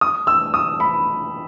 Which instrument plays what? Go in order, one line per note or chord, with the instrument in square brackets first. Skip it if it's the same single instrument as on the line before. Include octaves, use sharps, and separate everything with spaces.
[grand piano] D#6
E6
D#6
B5